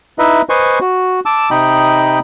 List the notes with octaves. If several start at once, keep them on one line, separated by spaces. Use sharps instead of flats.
D#4 E4 B4 D#5 E5
B4 C5 D#5 G#5 C6 C#6
F#4
A5 D6 E6
C3 D#4 D#5 G5 B5